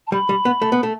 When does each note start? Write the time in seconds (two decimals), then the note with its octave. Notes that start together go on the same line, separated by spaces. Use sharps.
0.07 A5
0.12 G3 B5
0.29 G3
0.45 B3
0.62 A3
0.72 B3
0.83 A3